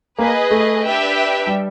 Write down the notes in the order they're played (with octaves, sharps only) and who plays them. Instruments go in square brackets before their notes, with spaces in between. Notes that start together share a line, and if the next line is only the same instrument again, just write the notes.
[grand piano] A#3 [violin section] G#4 B4 D#5
[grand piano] A3
[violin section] D4 G4 B4 E5 G5
[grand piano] G3